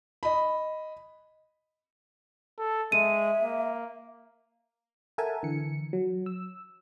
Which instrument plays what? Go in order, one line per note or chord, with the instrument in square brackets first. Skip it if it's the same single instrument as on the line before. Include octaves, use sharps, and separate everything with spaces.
[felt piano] D#5 B5
[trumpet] A4
[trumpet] G#3 [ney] E5 [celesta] D#7
[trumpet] A#3
[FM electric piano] A4 A#4 E5 F#5 G#5 A5
D3 E3 C#7
F#3
E6